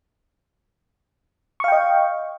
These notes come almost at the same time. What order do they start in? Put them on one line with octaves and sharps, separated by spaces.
C#6 F5 G5 D#5